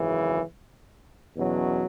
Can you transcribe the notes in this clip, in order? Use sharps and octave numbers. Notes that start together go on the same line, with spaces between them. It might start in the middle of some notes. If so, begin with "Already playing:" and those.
Already playing: G#1 F#2 C#3 E3
E2 B2 F#3 C#4